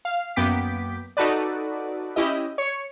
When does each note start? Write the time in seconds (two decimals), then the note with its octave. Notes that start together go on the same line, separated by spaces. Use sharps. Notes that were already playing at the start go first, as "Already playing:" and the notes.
0.05 F5
0.36 F#2 A#3 B3 G5 D6 B6
1.17 D#4 F#4 A4 B4 D5
2.16 C#4 E4 G4 D#5
2.58 C#5 C#7